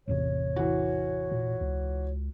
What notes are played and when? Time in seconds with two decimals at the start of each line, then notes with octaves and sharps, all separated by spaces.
0.08 A1 E2 C3 C#5
0.56 E3 F#4
1.32 A#2
1.61 C#2